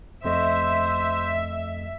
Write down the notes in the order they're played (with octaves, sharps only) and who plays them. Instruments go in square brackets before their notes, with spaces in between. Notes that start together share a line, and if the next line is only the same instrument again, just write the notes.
[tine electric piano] F2 A3 D#5 [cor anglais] C5 [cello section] E5